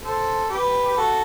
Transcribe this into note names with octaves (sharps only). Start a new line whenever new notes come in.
A4 C5
G4 B4
G4
F#4 A4